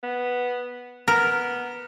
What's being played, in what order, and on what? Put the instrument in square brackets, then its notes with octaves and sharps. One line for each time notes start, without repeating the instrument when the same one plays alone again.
[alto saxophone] B3
[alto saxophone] B3 [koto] A#4